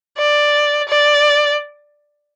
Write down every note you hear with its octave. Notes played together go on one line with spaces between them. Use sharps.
D5
D5